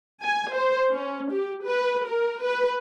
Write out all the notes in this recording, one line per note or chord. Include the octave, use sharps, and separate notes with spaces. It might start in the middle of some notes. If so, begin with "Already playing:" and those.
G#5
C5
C#4
G4
B4
A#4
B4